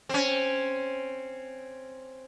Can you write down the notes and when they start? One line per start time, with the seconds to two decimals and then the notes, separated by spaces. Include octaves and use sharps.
0.09 C4 C#4